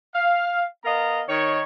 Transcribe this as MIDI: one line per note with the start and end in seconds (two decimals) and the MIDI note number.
0.15 0.63 77
0.85 1.21 59
0.85 1.21 70
0.85 1.21 75
0.85 1.21 77
0.85 1.21 82
1.29 1.63 51
1.29 1.63 73